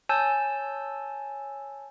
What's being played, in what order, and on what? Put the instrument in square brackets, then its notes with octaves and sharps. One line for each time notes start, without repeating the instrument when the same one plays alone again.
[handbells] C#5 G#5 A5 E6 G6